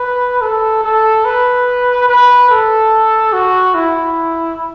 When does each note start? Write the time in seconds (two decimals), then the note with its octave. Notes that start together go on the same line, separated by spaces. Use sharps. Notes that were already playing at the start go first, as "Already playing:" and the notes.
Already playing: B4
0.42 A4
0.84 A4
1.25 B4
2.08 B4
2.50 A4
3.33 F#4
3.75 E4